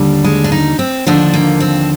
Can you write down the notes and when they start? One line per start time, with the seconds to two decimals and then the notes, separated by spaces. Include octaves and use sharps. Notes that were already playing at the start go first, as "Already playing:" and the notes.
Already playing: D#2 D3 G3
0.24 G#3
0.44 D4
0.52 D#4
0.79 C4
1.07 D#2 D3 F3 D4
1.34 A#3
1.60 C4